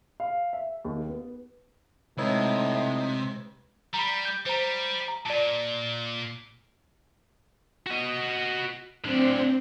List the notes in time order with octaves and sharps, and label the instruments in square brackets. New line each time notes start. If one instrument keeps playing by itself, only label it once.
[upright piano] F5
E5
D#2
B3
[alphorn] A2 [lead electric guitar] C3 [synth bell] G#3 B4 G#6 [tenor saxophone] D#4
[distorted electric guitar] G3 [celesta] A#5 B5
[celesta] G6
[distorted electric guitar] G3 [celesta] C5 A#5
[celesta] A#5
[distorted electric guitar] A#2 [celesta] D5 A5
[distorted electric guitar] F#4 D#5
[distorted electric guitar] A2 D4 [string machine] C4